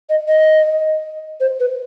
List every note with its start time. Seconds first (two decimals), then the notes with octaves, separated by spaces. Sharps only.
0.09 D#5
0.28 D#5
1.40 C5
1.60 B4